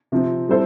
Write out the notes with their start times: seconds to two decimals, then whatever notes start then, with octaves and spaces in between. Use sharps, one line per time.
0.12 C3 F3 C4
0.49 G3 C4 E4 A4 C5